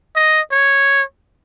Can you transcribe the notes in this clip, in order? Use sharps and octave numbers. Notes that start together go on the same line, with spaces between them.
D#5
C#5